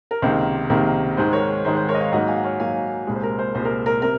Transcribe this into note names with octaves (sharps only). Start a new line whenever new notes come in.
A#4
C#2 C3 D#3 A#3 C5
C#2 C3 D#3 A#3
G#2 D#3 G#3 C5
A#4 C#5
G#2 D#3 G#3 C5
C5
A#4 C#5
D#5
C#5 F5
G#2 F#3 A#3 D#5 F#5
F5 G#5
F#5
C#5 F5
G#2 F#3 A#3 F5 G#5
C2 A#2 G#3
C5
A#4
C5
C2 A#2 G#3 C5
A#4
A#4
C3 A#4